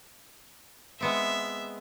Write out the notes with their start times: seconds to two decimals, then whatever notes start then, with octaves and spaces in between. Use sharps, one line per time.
1.00 G#3 B3 C4 E5